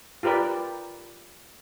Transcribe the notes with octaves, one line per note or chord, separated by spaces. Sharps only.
F4 G4 A#4 B4 D5